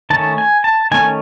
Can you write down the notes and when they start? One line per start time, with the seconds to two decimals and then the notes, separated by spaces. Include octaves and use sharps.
0.10 D#3 A3 C#4 A5
0.38 G#5
0.64 A5
0.92 D#3 A3 C#4 G#5